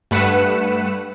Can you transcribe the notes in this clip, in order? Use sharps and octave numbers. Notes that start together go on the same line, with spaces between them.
G2 A3 B4 F#5 C#7 E7